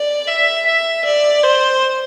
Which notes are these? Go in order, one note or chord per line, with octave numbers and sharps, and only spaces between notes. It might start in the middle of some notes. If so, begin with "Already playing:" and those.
Already playing: D5
E5
E5
D5
C5